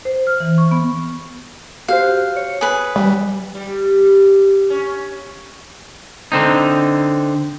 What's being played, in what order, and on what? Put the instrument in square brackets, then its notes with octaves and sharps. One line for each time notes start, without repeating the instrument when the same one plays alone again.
[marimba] C5
F6
E3
C#6
B3
[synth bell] F#4 G4 C5 [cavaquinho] F5
[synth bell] C#5
[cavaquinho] G#4 B4
[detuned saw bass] G3
[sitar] G3
C#4
[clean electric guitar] D3 C4 D#4